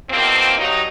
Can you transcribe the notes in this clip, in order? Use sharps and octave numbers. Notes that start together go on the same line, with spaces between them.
E2 B2 F3 A#3 C4
G2 F#3 D#4